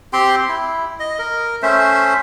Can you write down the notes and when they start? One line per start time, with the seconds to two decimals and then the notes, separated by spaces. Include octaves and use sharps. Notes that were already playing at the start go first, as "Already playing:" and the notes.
0.13 C4 G4 G5 C6
0.49 E4
1.00 D#5
1.19 A#4
1.62 A3 C#4 C5 E5